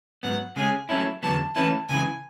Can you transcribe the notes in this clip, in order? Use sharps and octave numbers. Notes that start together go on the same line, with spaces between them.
G#2 F#3 B3 F#5
C#3 G#3 C#4 G#4 G#5
F#3 A3 C#4 E4 A5
E2 D3 F#3 B3 A5
E3 A3 C#4 E4 B4 A5
C#2 C#3 E3 G#5